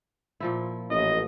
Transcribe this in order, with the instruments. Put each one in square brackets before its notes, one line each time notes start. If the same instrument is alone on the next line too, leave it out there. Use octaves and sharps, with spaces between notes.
[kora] A#2 F3 E4
[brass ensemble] A1 [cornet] D#5